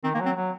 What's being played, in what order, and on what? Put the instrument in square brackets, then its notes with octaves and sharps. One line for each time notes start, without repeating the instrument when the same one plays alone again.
[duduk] D#3 [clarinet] C4
[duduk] D#3 [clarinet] A#3
[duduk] F#3
[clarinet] C4
[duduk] F#3